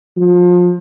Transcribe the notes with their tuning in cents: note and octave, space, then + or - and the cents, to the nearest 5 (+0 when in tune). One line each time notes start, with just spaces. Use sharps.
F3 +30